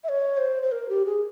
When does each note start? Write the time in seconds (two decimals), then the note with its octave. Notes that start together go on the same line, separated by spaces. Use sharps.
0.04 E5
0.09 C#5
0.38 C5
0.63 C5
0.72 A#4
0.89 G4
1.06 G#4